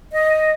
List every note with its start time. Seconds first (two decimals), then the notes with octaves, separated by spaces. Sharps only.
0.12 D#5